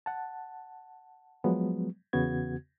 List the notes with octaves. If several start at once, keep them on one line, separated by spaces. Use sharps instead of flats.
F#5 A5
F3 F#3 G#3 B3
E2 C#3 B3 F#4 G#6